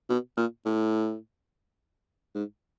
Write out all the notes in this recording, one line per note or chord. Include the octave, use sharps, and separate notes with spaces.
B2
A#2
A2
G#2